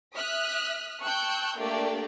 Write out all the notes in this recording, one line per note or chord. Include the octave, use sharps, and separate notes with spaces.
E5 D#6 F6 F#6 B6
G5 A5 C#6 E6 F#6 G6
A3 A#3 D4 G4 D5 G5